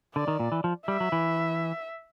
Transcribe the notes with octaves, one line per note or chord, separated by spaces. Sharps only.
D3 D5
D#3
A#2
E3
F3
G3 E5
F#3
E3